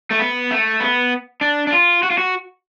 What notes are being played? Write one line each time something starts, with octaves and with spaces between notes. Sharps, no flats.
A3
B3
A3
B3
D4
D4
F4
F#4
F4
F#4